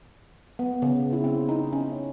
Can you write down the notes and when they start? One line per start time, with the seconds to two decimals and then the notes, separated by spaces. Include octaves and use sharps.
0.59 B3
0.82 C#3
1.13 E4
1.24 C4
1.49 D#4
1.73 C#4